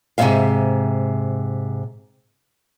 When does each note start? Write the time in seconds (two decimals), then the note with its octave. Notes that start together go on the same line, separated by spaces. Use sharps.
0.18 G#2 C3 E3 G#3 E5 F5